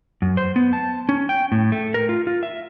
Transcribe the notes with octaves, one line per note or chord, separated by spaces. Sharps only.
F#2
C5
B3
A5
C#4
G5
A2
A3
A#4
F4
F4
E5